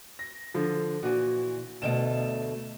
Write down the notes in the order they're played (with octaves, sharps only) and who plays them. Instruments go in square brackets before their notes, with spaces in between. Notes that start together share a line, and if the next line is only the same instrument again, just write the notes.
[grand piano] A#6
D3 F3
[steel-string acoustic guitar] A#2 E3 [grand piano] F#4
[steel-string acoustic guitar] D2 B2 A3 [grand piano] E7